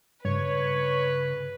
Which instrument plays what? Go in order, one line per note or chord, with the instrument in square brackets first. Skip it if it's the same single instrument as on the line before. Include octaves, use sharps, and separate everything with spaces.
[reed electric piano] G2 [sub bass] C#3 [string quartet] B4 [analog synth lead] C#5